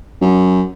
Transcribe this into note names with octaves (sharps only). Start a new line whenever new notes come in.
F#2